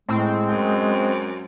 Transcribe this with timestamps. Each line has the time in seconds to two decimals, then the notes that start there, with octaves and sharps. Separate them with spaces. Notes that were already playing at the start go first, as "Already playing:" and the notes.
0.09 A2 G#3 C4
0.49 F#2 G5